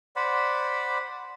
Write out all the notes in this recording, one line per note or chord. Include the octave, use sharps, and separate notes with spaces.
C5 D5 F#5 B5